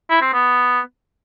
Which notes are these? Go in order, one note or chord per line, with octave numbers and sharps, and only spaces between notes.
E4
C4
B3